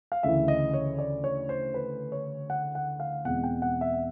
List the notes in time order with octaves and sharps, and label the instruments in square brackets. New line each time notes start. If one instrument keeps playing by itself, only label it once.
[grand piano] F5
D2 C#3 E3 E5
D#5
C#5
D5
C#5
C5
B4
C#5
F#5
F#5
F5
E2 B2 G#3 C4 F#5
G5
F#5
E5